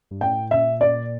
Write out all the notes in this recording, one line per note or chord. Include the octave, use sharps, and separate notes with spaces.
G2
A2 G5
A#2 E5
D5